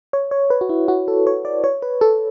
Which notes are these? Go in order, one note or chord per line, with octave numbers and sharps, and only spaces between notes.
C#5
C#5
B4
F#4
E4
F#4
A4
C#5
D5
C#5
B4
A4